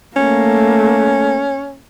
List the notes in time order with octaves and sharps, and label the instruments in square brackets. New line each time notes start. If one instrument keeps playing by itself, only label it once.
[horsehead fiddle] A3 A#3 [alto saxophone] C#4